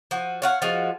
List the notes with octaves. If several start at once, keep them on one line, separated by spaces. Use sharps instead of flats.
F3 F#4
C#5 F5 F#5
F3 G#3 F4 F#4